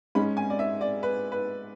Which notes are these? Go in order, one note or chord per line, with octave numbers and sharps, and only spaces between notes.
G#2 G#3 C#4 B5
G#5
D5
E5
D5
B4
B4